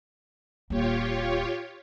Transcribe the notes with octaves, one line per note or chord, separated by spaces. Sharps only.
D#1 A#3 F4 G4 C#5